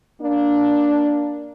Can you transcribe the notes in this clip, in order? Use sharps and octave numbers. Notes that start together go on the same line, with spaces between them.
A#3 D4